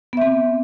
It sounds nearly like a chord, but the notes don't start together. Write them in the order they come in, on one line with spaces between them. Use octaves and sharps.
B3 E5 C4